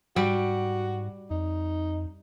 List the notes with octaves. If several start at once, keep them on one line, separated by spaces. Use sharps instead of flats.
G#2 G3 F#4 G4
F2 D#4